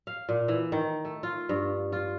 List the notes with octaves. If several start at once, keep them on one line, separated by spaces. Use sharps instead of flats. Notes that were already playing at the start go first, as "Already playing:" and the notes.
F5
A#2
E3
D#3
A3
F4
G2
F4